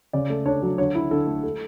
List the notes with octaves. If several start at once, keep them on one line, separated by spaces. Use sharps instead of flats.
C#3 D5
A3
D4 C#5
F#3
D3 C#5
E4
D3 A4
A3
A4